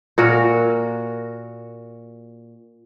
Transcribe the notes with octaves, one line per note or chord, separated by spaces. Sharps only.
A#2 F#4 A#4